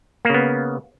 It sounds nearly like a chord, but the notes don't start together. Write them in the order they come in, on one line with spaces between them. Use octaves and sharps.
A#3 C#3 B3